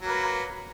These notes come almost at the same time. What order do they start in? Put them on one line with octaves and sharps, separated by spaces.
F#3 A#3 B4